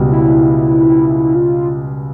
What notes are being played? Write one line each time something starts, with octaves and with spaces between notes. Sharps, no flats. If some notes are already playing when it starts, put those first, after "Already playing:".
Already playing: C#2 B2 G3
E4
F4